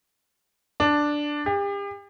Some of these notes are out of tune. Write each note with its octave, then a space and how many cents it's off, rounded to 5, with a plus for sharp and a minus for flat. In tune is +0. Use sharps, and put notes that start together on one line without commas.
D4 +5
G4 +40